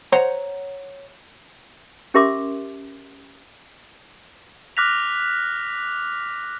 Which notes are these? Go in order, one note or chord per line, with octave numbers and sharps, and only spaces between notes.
C5 C#5 F#5 A#5
C#4 G4 A#4 E5 C6 D6
D6 F6 F#6 A#6 B6 F7